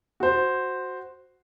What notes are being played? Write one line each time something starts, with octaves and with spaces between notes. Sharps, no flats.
F#4 C5